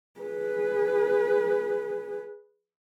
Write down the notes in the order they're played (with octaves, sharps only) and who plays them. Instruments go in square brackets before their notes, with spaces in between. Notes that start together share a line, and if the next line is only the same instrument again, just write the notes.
[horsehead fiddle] G#4 B4